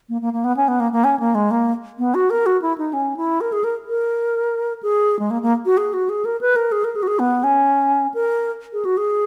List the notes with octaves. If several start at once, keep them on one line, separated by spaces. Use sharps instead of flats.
A#3
A#3
A#3
B3
C#4
B3
A#3
A#3
C#4
A#3
G#3
A#3
B3
F#4
A#4
F#4
E4
D#4
C#4
E4
A#4
G#4
A#4
A#4
G#4
G#3
A#3
A#3
F#4
G#4
F#4
G#4
A#4
B4
A#4
G#4
A#4
G#4
F#4
G#4
B3
C#4
A#4
G#4
F#4
G#4